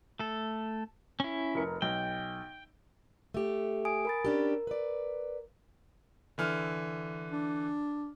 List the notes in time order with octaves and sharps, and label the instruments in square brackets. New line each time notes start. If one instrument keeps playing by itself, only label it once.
[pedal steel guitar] A3 A4
C#4 E4
[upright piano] F1 A#4 C#7
[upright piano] B1 [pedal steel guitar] G5
[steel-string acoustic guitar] A3 G4
[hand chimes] G#5 D#6 D7
A#4 B5 A6
[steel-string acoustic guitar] C#4 D4 G4 [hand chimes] A#4
[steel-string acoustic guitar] B4 D5
[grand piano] D3 E3 F6
[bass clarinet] D4